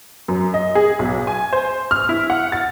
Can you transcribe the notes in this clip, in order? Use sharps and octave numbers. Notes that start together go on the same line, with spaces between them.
F#2
D#5
G#4
B1
G#5
C5
F6
E4
F#5
A6